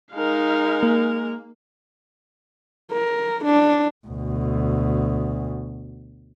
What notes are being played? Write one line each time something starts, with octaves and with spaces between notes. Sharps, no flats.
G#3 D#4 A#4 F5
A#3
A#4
D4
D2 B2